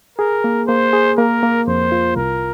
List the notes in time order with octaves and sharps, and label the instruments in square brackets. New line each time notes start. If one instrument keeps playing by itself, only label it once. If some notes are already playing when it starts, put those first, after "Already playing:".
[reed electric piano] G#4 [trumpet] A#4
[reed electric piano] A#3
[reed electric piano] A#3 [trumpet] C5
[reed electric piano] G#4
[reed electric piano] A#3 [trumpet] A#4
[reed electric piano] A#3
[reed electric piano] F2 [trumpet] C5
[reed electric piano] F4
[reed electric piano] C2 [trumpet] A#4